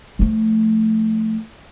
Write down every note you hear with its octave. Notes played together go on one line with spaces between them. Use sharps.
F3 A3